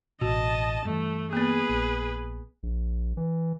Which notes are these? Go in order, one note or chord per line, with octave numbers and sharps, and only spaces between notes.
A1 B2 F#4 D#5 A5
G2 E3 A3
A#3 B3 G#4 B4
A#1
A#1
E3